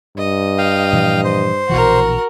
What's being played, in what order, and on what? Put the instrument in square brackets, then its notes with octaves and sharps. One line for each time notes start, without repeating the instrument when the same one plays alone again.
[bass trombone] G2 [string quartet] D#5
[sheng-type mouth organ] F5 G5
[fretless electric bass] A#2 E3 F3
[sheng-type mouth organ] C5
[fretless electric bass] A#1 B2 E3 [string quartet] F#4 A#4